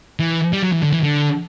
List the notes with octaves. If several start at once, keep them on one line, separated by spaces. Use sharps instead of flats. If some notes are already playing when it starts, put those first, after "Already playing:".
E3
G3
F#3
E3
D3
E3
D3